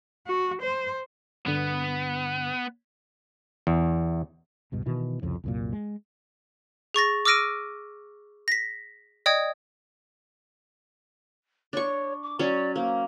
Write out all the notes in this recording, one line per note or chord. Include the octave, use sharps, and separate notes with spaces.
F#4
C5
G2 D3 B3
E2
C#2 G2 B2
B2 D#3 E3
C2 F2 C#3
C2 F#2 A#2
G#3
G#4 C#6 A6 A#6
D6 E6 F6 A#6 D7 D#7
A#6 B6
D5 D#5 G5 D#6 G#6
D4 C#5 C#6
D6
F#3 C#4 D5
A#3 C5